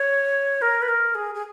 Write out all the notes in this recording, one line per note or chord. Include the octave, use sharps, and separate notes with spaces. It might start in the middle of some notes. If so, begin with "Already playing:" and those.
Already playing: C#5
A#4
B4
A#4
G#4
G#4